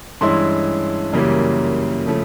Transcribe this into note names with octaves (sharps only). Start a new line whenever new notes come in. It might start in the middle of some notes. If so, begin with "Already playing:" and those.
G2 E3 G#3 C#4 E4 C6
F#2 C#3 E3 G3 A#3
C#3 F3 A3